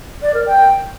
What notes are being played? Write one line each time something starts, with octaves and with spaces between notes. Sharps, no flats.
D5
A#4
G5